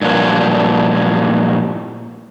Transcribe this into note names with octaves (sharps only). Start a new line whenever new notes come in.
G2 A#2 F3 F#3